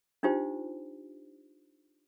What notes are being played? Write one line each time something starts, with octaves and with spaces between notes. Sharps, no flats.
D4 D#4 F4 G4 C5